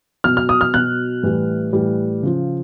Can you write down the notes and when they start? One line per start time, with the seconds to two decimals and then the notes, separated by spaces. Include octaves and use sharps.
0.24 B2 F#3 F6
0.37 F6
0.49 D#6
0.61 F6
0.74 B2 F#3 F#6
1.23 A2 E3 G3
1.73 A2 E3 G3
2.23 C#3 F3